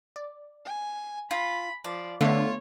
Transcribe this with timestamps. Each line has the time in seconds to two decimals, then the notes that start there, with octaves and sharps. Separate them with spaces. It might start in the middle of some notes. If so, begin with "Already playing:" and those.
0.16 D5
0.66 G#5
1.31 F4 B5
1.84 F3 D5
2.21 D3 A3 B3 F4 C#5 E5